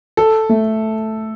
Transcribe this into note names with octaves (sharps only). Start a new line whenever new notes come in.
A4
A3